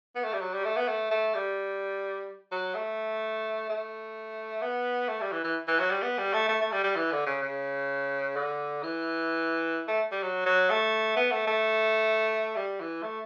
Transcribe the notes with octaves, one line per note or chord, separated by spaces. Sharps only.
B3
A3
G3
F#3
G3
A3
B3
A3
A3
G3
F#3
A3
A3
B3
A3
G3
E3
E3
E3
F#3
G3
B3
G3
A3
A3
A3
G3
G3
E3
D3
C#3
C#3
D3
E3
A3
G3
F#3
F#3
A3
B3
A3
A3
G3
E3
A3